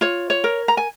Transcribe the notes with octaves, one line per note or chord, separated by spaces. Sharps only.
F4 C#5
C#5
A#4
A#5
G#5